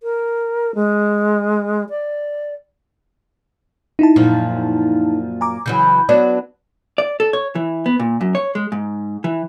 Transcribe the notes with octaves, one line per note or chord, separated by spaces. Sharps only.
A#4
G#3
D5
D#4 E4 A5
F#2 A#2 F3
G#5 A#5 D6
C#3 E3 F#3 G6
F#3 B3 D4
D5
A4
C#5
E3
B3
A#2
F#2
C#5
G#3
G#2
E3